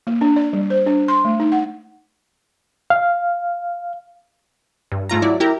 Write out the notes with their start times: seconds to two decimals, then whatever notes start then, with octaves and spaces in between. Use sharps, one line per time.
0.07 A#3
0.21 D4
0.36 D5
0.53 G3
0.70 C5
0.86 D4
1.08 C6
1.25 A3
1.40 D#4
1.52 F#5
2.90 F5
4.92 G2
5.09 G#2 A3 F4 A#5
5.22 F#3 E4 D5
5.40 E4 G4 A#4 A#5